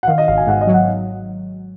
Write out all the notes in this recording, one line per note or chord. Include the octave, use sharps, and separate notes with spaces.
F#5
D#3 F5
D#5
G#1 F5
G#5
G#2 F#5
D#5
F#3
F#5